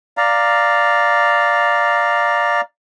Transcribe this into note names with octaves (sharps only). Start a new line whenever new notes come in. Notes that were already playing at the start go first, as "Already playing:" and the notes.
D5 F5 A#5